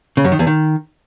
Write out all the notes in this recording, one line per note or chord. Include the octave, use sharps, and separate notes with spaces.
C#3
F#2
D#3
E2
D#3